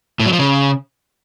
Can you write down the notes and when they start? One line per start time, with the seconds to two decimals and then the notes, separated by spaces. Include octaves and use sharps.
0.20 A2
0.26 F#3
0.33 F3
0.39 C#3